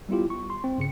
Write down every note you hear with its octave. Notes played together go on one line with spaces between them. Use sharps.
G3 B3 E4 F4 G4
C#6
C6
C4
G2 C#3 C#7